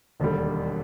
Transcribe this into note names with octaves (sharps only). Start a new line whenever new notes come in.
E1 D#2 D3 G3